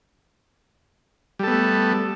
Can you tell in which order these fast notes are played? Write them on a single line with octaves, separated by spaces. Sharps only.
G3 A4 B3 A3